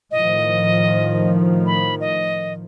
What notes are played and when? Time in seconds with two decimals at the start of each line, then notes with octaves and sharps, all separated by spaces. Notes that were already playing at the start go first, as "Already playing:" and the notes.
0.11 A2 D#3 F3 D#5
1.66 B5
2.01 D#5